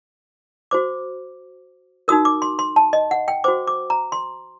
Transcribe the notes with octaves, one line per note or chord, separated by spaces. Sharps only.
F#4 C5 D6
D#4 F#4 A#4 D#6
D6
C6
C6
A5
D#5
F#5
G5
F#4 C5 D6
D6
A#5
C6